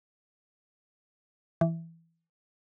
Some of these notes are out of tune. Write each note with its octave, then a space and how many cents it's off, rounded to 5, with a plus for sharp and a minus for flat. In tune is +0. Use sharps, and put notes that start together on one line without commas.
E3 +5